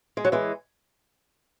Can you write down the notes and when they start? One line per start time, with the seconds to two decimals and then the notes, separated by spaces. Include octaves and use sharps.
0.17 G#3
0.25 F#3
0.32 E3 G#3